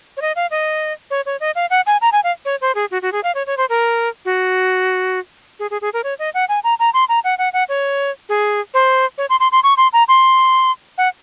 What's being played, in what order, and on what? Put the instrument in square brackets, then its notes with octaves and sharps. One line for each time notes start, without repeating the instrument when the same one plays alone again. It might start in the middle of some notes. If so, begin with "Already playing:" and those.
[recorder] C#5
D#5
F5
D#5
C#5
C#5
D#5
F5
F#5
G#5
A#5
G#5
F5
C#5
C5
G#4
F#4
F#4
G#4
F5
C#5
C#5
C5
A#4
F#4
G#4
G#4
G#4
A#4
C#5
D#5
F#5
G#5
A#5
A#5
C6
A#5
F#5
F#5
F#5
C#5
G#4
C5
C#5
C6
C6
C6
C#6
C6
A#5
C6
F#5